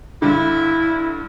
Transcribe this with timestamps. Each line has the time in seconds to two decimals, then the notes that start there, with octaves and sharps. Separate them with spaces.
0.22 G2 D3 E4